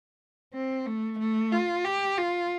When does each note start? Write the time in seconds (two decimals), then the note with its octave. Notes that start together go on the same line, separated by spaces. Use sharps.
0.53 C4
0.86 A3
1.19 A3
1.52 F4
1.85 G4
2.18 F4